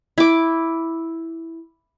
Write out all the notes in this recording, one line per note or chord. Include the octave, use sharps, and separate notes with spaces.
E4 D6